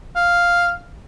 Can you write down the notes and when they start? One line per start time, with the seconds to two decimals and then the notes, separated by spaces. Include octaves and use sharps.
0.16 F5